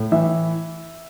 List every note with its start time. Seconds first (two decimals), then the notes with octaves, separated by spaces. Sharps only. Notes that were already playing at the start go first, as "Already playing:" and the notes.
Already playing: A2
0.12 E3 E5